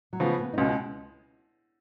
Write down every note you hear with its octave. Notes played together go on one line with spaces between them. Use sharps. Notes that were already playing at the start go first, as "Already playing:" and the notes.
F#3
C#3 F3 G#3 B3
B3
D#4
C#2 B2 G#3 C#4